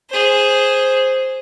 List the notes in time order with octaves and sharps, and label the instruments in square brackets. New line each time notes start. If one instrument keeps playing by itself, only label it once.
[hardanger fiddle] G#4 C5